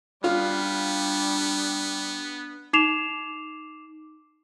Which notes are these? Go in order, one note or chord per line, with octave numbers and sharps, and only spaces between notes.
G3 B3 D4 F4
D#4 D6 C7 E7 F7